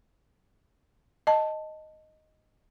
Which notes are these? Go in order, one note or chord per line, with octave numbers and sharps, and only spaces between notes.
D#5 A5